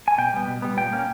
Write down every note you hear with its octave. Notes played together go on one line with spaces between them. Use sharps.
G#5
B2 G5
G3 B3
B2
G3 B3
A#2 G5
A#3 C#4